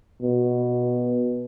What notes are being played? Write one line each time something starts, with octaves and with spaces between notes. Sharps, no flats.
B2